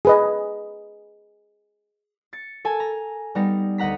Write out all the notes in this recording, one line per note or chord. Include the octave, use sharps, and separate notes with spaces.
G#4 B4 D#5
A6 C#7
A4 G#5 A5
A#5
G3 B3 D#4 A#6
D2 D#5 F#5 A#5 B6